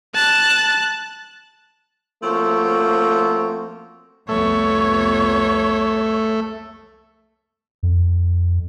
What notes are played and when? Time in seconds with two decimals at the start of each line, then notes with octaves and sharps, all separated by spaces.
0.15 A5 F#6
2.22 F3 A3 A#3 C4 C#4 F#4
4.29 C2 F2 A3 B3 C#5
7.83 F2